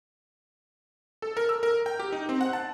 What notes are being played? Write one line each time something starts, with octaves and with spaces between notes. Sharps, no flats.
A4
A#4
E6
A#4
G5
G4
D#4
C4
F#5
A5